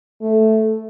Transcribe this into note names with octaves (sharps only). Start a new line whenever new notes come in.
A3